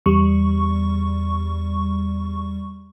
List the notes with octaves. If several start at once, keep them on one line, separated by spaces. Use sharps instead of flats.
E2 G3 C#6